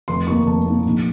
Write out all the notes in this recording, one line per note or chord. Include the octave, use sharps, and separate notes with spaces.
F1 C6
D#2 D#3 A#3 D#4 C#6
F1 A5
D#2 D#3 A#3 D#4
A#1